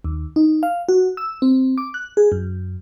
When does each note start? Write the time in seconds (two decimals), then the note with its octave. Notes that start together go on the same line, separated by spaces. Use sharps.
0.04 D#2
0.36 D#4
0.63 F5
0.89 F#4
1.17 E6
1.42 C4
1.78 D6
1.94 F#6
2.17 G#4
2.32 F#2